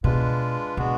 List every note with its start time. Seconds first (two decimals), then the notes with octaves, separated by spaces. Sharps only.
0.04 B2 G#3 D4 F4 B4
0.77 B2 G#3 B3 D4 F#4